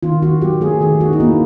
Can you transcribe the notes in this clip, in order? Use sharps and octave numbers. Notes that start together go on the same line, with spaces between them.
D#3 F4
D#3 F#4
F#3 G4
A3 G#4
D#3 G#4
A3 F#4
D#4
A#3 E4